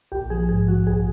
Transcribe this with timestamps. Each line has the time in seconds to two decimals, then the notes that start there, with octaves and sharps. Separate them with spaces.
0.12 A#1 G4
0.30 F3 G#4
0.49 G#2 G#4
0.68 F3 F#4
0.87 A#1 G#4